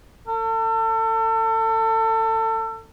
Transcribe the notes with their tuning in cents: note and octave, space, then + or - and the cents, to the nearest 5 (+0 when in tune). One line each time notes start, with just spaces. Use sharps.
A4 +30